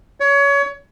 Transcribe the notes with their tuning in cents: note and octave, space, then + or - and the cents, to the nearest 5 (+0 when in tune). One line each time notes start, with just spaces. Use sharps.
C#5 +25